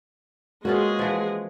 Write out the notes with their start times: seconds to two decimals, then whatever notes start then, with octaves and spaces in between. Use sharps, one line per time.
0.65 G#3 A#3 B3 C#4 F4 F#4 G#4
0.99 E3 F3